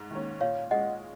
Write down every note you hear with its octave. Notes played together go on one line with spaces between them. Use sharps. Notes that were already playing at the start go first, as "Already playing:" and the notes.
Already playing: G#2
D#3 A#3 C#4
A#2 C#5 F5
G#3 C#4 D#5 F#5